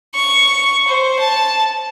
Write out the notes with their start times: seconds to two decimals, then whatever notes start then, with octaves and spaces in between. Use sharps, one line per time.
0.15 C#6
0.88 C5
1.19 A5